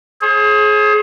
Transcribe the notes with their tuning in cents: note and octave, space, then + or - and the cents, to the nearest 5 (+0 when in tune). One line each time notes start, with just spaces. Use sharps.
G#4 +25 C5 +45